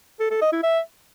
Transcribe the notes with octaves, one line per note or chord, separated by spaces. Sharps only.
A4
A4
D#5
E4
E5